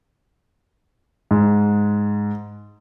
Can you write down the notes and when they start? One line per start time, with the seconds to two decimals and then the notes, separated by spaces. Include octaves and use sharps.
1.31 G#2